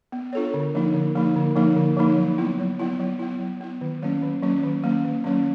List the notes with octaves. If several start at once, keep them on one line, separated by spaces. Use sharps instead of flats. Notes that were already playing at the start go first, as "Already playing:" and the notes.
B3
D4 F4 A4 C#5
D3
F3 A#3 D#4
D3
F3 A#3 D#4
D3
F3 A#3 D#4
D3
F3 A#3 D#4
F#3
B3 E4
F#3
B3 E4
F#3
B3 E4
F#3
B3 E4
D#3
F#3 A#3 C#4
D#3
F#3 A#3 C#4
D#3
F#3 A#3 C#4
D#3
F#3 A#3 C#4